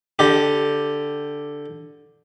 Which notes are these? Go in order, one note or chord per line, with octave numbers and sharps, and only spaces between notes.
D3 G4